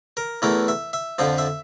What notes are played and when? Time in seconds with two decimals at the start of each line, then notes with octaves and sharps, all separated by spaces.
0.17 A#4
0.42 E2 E3 A3 A#4
0.68 E5
0.93 E5
1.19 F2 D3 F3 F5
1.38 E5